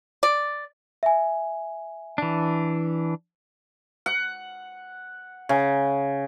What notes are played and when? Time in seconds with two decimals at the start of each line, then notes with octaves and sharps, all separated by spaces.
0.23 D5
1.03 E5 G#5
2.18 E3 D4
4.06 F#5
5.49 C#3